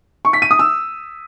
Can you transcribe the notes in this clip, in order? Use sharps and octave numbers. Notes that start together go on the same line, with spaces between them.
C#6
B6
D#7
D#6
E6